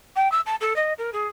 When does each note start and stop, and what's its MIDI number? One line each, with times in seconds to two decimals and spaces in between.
0.16 0.30 79
0.32 0.41 88
0.46 0.55 81
0.61 0.76 69
0.76 0.93 75
0.98 1.11 70
1.13 1.28 68